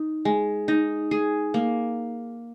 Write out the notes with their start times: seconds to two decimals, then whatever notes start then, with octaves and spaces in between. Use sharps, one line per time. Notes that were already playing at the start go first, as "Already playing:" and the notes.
Already playing: D#4
0.25 G#3
0.68 D#4
1.11 G#4
1.54 A#3